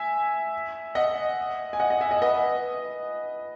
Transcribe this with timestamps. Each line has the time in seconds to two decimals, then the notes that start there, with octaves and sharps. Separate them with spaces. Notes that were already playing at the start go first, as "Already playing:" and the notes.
Already playing: E5 G#5
0.95 D#5 F#5
1.73 G#5
1.80 D#5 F#5
1.90 D#5 F#5
2.01 E5 G#5
2.11 D#5 F#5
2.22 B4 D#5